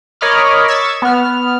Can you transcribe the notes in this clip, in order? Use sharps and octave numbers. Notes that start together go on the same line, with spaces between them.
A#4 C#5 D#5 B5 D6 F6
C#6 E6 G#6 A6 B6
B3 F6